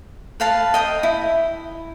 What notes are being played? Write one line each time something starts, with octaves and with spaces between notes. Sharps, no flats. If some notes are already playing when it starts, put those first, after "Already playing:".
B4 F5 A5
D#5 G5 G#5 D#6
E4